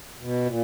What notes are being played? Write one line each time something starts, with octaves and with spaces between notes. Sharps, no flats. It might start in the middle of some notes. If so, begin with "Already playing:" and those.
B2
A#2